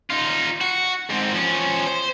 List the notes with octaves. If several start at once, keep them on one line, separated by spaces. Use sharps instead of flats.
D#4 F4
F#4
G#2 C4
F3 C#4
C5